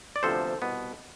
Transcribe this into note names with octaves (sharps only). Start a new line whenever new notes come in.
D5
D2 C3 F3 B3 A4 C5
C2 B2 B3